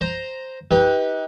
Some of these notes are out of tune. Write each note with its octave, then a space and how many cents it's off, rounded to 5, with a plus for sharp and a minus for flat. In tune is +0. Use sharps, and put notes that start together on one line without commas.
C5 +0 A#5 +0
D#4 +35 G4 +0 B4 -10